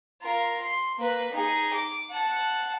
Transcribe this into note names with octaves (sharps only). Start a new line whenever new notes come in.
F4 A#4
C6
A#3 B4
D#4 G#4
D6
F#5 A5